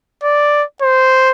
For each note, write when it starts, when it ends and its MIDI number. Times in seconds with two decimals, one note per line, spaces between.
0.23 0.63 74
0.82 1.32 72